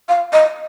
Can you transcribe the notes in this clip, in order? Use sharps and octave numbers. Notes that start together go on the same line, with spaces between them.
F5
D#5